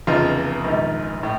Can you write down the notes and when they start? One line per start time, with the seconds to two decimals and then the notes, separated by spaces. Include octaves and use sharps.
0.07 F1 E2 C#3 D#4 F4
0.64 A#1 G#2 D#3
1.23 A2